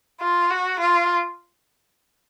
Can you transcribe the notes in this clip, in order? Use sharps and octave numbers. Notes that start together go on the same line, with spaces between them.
F4
F#4
F4